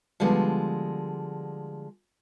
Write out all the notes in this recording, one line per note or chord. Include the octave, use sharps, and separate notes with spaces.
D3 F3 G3 G#3 B3